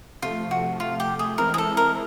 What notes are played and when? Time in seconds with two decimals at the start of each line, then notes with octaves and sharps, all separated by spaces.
0.22 C3 F3 A3 F4
0.51 F#4
0.80 F4
1.00 G4
1.19 G#4
1.38 E3 G#3 C4 E4 A#4
1.54 G#4
1.58 A4
1.77 A#4